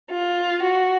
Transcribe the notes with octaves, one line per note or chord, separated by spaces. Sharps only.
F4
F#4